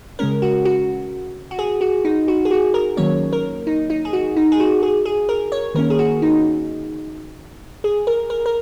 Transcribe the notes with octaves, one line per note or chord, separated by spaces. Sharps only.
C#3 G#3 C#4 A#4
F#4
F#4
F#4
G#4
F#4
D#4
F#4
G#4
F#4
A#4
D#3 F#3 A#3 C#4 C#5
A#4
D#4
D#4
G#4
F#4
D#4
G#4
F#4
G#4
G#4
A#4
C#5
D#3 A#3 C#4 A#4
G#4
F#4
D#4
G#4
A#4
A#4
A#4